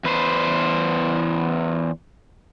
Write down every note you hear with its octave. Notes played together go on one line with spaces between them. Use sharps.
E2 B4 C5